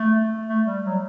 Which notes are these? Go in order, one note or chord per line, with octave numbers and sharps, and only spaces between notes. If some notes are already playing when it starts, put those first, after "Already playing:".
Already playing: A3
A3
G3
F#3